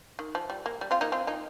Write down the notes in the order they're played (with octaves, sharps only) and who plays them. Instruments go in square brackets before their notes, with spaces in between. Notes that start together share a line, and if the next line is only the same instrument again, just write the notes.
[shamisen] D#3
F3
G3
A#3
G3
C4 F4
A#3 D#4
C4 F4
A#3 D#4